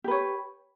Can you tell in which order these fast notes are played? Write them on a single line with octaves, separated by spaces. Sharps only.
G4 B4 C#5